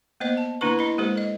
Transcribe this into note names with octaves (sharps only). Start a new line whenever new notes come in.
A#3 B3 C5 D#5
A5
D3 A#3 D4 E4 B4 C#6
D4 E4 D#5 B5
G#3 A#3 G4 A4 C5
A4 D#5